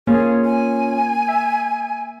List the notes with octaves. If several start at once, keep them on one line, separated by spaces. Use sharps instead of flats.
A#3 C#4 F4 G#4
G#5
E5